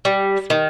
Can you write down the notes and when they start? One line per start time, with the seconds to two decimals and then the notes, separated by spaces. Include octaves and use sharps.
0.05 G3
0.50 D#3